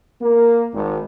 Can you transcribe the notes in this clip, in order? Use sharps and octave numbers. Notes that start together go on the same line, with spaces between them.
A#3
G#1